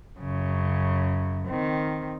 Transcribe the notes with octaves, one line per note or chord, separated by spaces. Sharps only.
F#2 C#3
D#3 C4